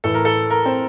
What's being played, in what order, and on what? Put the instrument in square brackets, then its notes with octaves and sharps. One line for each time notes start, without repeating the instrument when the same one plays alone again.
[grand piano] A2 E3 A4
A#4
A4
A#4
C4